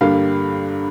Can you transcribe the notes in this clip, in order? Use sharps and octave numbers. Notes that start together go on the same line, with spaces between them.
G2 D3 G3 A#3 F5